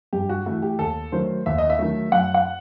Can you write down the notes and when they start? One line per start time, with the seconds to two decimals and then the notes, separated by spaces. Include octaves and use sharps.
0.13 G2 G4
0.29 F#4
0.46 E3 A3 F#4
0.62 G4
0.79 D#2 A4
1.12 D#3 F#3 A3 C5
1.46 D#2 E5
1.58 D#5
1.70 E5
1.79 D#3 F#3 A3
2.12 F#2 F#5
2.34 F#5